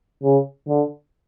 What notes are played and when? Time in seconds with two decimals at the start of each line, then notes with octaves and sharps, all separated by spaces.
0.24 C#3
0.68 D3